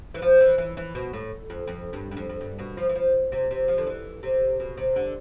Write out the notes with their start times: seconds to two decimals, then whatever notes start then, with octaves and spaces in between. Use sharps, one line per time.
0.14 E3
0.22 F3
0.41 E3
0.58 E3
0.77 E3
0.95 B2
1.13 A2
1.50 F2
1.67 F2
1.93 G2
2.11 G2
2.17 F2
2.29 F2
2.41 G2
2.59 B2
2.77 F3
2.89 E3
2.95 F3
3.32 C3
3.51 C3
3.68 F3
3.78 D3
3.87 E3
4.23 C3
4.60 B2
4.77 C3
4.96 D3